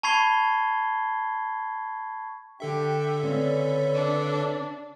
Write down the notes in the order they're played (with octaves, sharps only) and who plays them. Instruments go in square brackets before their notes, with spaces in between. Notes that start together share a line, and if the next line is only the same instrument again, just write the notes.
[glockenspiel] A5 B5 C#6 G#6 C7 G7
[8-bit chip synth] D3 A4 E5 [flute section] D4 G4 G5
[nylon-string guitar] C#3 C4 C#4 [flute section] B4 D5
[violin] D4